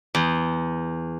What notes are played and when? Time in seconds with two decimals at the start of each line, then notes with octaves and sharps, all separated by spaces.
0.15 E2